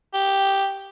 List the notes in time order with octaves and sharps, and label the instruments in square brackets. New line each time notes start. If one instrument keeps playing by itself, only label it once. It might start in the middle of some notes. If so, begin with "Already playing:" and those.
[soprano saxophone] G4